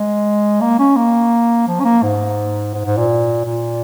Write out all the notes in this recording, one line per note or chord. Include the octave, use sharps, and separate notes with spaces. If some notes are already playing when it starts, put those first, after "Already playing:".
Already playing: G#3
A#3
C#4
A#3
F3
C#4
A#3
G#2
G#2
G#2
A#2
A#2